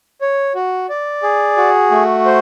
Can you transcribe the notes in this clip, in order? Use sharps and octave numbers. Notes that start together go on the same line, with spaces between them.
C#5
F#4
D5
G#4
F#4
A3
C5